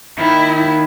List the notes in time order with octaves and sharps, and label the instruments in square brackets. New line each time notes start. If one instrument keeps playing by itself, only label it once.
[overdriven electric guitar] D#2 D#3 [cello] E4